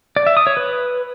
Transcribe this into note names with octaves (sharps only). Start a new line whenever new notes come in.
D5
E5
D#6
C#5
B4